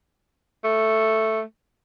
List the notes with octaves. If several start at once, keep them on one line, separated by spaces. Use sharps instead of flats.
A3